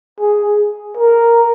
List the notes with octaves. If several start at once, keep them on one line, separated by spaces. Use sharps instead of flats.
G#4
A#4